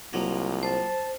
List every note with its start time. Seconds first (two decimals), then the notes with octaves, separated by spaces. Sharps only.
0.13 C2 F3 F#3 A#3
0.63 C5 A5